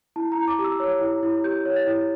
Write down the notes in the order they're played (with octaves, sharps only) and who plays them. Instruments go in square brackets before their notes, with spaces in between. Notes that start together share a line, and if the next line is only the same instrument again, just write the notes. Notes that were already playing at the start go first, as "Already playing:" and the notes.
[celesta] E4 A5
A#5
E4
D6
G4
E6
C#5
E4
E4
G4 G6
C#5
A6
E4